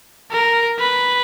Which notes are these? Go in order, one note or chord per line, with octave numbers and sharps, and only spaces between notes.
A#4
B4